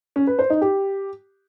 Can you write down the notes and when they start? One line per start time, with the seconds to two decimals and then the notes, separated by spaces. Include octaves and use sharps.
0.16 C#4
0.27 B4
0.39 C5
0.50 D#4
0.61 G4